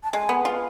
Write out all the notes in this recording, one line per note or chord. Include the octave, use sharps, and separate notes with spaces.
A5
G#3 G#5
B3
F4 F5 G#5